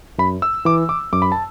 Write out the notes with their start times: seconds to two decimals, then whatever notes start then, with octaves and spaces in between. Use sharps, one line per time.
0.18 F#2 B5
0.42 E6
0.65 E3 D6
0.89 D6
1.13 F#2 D6
1.22 B5
1.32 A5